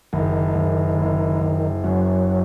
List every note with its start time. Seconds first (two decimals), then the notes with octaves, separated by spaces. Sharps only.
0.13 F#1 D#3
0.55 F#1
0.98 F#1
1.41 F#1
1.84 F#2 F#3